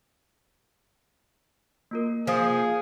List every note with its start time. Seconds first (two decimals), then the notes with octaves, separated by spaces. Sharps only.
1.91 A#3 F4 A#4
2.27 F3 G#4